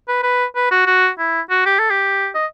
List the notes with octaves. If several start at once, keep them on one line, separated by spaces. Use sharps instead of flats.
B4
B4
B4
F#4
F#4
E4
F#4
G4
A4
G4
D#5